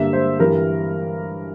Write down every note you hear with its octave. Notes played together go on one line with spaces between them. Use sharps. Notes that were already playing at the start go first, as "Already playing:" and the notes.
Already playing: G2 D3 G3 A#3 E5
C5
G2 E3 G3 A#4